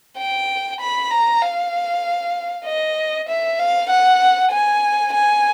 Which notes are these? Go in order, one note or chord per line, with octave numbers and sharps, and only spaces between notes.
G5
B5
A#5
F5
D#5
E5
F5
F#5
G#5
G#5